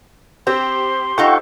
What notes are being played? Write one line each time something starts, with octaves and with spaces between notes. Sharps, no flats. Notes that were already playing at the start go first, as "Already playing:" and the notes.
C4 G4 C5 C6 G6
D#4 F4 A4 F#5 G5 C#6